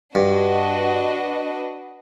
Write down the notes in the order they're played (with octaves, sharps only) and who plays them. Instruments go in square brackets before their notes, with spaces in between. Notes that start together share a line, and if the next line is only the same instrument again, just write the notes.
[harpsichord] G2 [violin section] D4 F#4 B4 D#5